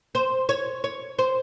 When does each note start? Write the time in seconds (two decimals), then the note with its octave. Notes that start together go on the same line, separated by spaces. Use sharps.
0.15 C5
0.49 C#5
0.84 C#5
1.19 C5